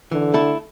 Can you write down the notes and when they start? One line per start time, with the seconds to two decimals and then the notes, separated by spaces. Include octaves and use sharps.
0.12 D3 E3
0.34 A3 E4 A4